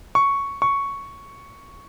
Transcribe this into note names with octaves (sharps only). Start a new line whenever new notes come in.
C#6
C#6